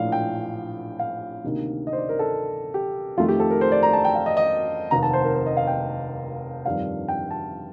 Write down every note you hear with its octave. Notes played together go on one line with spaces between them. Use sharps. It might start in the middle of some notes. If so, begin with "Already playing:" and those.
Already playing: A#1 A2 F3 A#3 D4 F5
G5
F5
D2 C3 D#3 A#3 D#4
D#5
C5
D5
A#4
A4
G4
F2 D#3 A3 F4
G4
A4
A#4
C5
D5
A#5
A5
G5
F5
D#5
D#5
F1 D#2 D#3 A#5
A5
C5
A#4
C5
D#5
F5
G5
G1 F2 D#3 G3 D4 F5
G5
A5